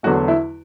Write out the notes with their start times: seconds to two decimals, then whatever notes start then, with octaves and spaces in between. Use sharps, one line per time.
0.03 E2 D3 F#3 A3 F#4
0.28 E4